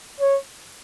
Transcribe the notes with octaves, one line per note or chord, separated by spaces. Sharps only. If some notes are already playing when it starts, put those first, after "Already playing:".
C#5